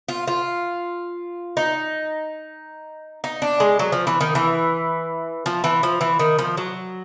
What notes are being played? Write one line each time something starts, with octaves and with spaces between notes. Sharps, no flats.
F4
F4
D#4
D#4
D4
G#3
F#3
F3
E3
D#3
E3
F3
E3
F3
E3
D#3
F3
F#3